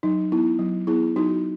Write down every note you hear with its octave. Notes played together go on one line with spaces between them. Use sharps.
F#3 D#4
B3 E4
F#3
B3 E4 G#4
F#3 D#4 F#4